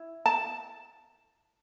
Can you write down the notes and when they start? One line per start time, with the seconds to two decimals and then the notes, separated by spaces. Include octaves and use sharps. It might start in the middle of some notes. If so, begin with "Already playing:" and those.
Already playing: E4
0.26 A5